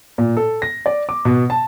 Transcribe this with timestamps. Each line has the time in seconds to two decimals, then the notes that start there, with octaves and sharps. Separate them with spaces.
0.18 A#2
0.37 A4
0.62 A#6
0.86 D5
1.09 D6
1.25 B2
1.50 A5